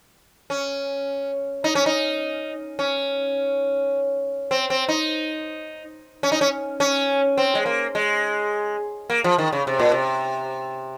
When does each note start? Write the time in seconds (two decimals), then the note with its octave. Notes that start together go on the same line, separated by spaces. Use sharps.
0.50 C#4
1.64 D#4
1.75 C#4
1.86 D#4
2.79 C#4
4.51 C4
4.70 C4
4.89 D#4
6.23 C#4
6.32 D#4
6.41 C#4
6.80 C#4
7.38 C4
7.55 G#3
7.66 A#3
7.95 G#3
9.10 A#3
9.24 F3
9.38 D#3
9.52 C#3
9.67 C3
9.79 A#2
9.92 C3